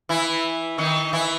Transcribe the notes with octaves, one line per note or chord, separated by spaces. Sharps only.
E3 E4
D#3 D#4
E3 E4